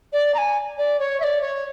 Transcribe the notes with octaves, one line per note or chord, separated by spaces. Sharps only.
D5
A#5
G#5
D5
C#5
E5
D5
C#5